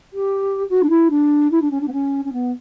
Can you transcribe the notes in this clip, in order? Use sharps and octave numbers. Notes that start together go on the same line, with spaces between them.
G4
F#4
D4
E4
D4
E4
D4
C#4
D4
B3
C#4
C#4
B3